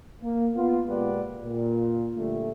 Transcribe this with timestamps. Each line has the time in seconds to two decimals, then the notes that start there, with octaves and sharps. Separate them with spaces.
0.22 A#3
0.55 B3 F4
0.87 A#2 G#3 G4 B4 D5 F#5
1.43 A#2
2.15 A#2 D3 G3 A3